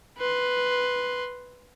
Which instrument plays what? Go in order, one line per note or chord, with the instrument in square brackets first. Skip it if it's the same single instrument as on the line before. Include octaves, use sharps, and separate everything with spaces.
[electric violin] B4 C6